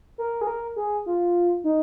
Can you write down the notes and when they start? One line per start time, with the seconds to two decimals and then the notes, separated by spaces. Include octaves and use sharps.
0.18 A#4
0.41 G#4
0.47 A#4
0.76 G#4
1.06 F4
1.64 D#4